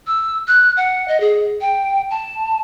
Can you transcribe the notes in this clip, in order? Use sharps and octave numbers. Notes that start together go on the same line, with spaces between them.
E6
F#6
F#5
D#5
G#4
G5
A5